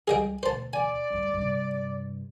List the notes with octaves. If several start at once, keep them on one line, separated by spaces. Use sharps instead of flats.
C#2 G3 G#4 D#5 G5
D2 B2 C5 A5
D5 G#5
D2 G2
G2 C3